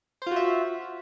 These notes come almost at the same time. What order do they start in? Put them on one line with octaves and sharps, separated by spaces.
C5 F4 F#4 E5